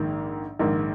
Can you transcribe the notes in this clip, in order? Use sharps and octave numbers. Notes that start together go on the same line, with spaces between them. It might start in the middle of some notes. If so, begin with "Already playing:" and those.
Already playing: A#1 G#2 D#3 A#3
A#1 G#2 D#3 A#3